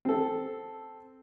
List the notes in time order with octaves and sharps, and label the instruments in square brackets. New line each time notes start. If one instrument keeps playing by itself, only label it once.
[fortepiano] C4 A4